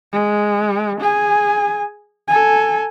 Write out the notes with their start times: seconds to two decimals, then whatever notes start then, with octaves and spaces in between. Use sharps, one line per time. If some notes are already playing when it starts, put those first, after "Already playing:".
0.13 G#3
1.01 G#4 G#5
2.28 A4 G#5